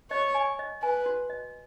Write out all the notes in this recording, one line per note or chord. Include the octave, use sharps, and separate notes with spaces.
C#5 D#5
G#5
D#5
B4 G#5
F#4
D#5